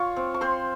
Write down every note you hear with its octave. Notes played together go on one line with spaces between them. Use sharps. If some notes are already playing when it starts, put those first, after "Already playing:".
Already playing: F4 C#5 C#6
C4
C#6
C4 C5 C6